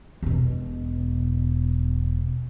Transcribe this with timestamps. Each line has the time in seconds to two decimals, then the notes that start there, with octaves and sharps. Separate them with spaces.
0.23 E1 B2